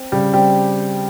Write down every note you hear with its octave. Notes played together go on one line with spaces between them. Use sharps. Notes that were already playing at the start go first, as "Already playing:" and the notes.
Already playing: C4
C#3 G3 G4
G3 C4 G4